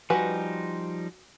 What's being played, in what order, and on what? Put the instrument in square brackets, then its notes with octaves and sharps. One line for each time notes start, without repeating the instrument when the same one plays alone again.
[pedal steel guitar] F3 G3 D#4 [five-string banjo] F#4 B4 [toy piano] G#5